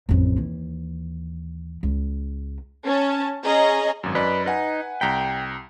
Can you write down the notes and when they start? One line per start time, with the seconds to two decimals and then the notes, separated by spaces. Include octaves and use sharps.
0.09 A1 F2
0.36 D#2 E3
1.83 C#2
2.85 C#4 A5
3.43 C#4 G#4 C#5 D#5 A#5
4.03 G#1 F#2
4.15 F#2 B4 D5 D#5
4.46 D#4 B4 F#5 G#5
5.01 C2 G5 A#5 B6